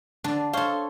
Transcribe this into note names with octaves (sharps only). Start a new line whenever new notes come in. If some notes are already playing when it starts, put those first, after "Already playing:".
D3 D4
A4 C5 C#5 F5